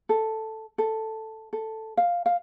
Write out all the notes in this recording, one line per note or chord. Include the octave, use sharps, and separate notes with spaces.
A4
A4
A4
F5
F5